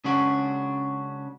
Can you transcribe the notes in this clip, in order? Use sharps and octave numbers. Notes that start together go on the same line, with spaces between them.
C#3 G#3 C#4 D4 F#4